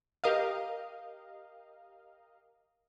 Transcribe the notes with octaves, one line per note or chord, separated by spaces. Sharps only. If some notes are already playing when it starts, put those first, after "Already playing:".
G4 A#4 D#5 F5